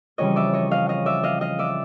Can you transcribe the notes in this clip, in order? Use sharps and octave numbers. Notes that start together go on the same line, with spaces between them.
F2 C#3 E3 G3 C#5 D#5
D5 E5
C#5 D#5
D#5 F5
D#5 F5
D5 E5
D#5 F5
D#5 F5
D5 E5